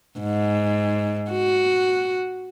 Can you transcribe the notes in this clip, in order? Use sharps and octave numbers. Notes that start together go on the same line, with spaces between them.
G#2
F#4